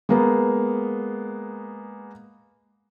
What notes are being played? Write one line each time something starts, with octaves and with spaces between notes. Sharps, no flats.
G#3 A#3 B3